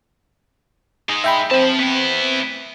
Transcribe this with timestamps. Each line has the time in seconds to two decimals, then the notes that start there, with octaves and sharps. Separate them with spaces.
1.09 G#3 D#4
1.24 E5 G5 B5
1.51 C4 C5 A5
1.79 B3 E4